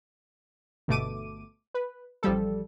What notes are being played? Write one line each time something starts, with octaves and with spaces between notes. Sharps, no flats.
G1 B2 A3 D6 D#7
B4
A1 F3 G3 A4